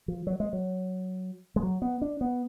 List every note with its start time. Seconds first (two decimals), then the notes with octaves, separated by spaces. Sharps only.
0.08 F3
0.27 F#3
0.40 G#3
0.53 F#3
1.56 G#3
1.63 F#3
1.82 B3
2.02 D4
2.21 B3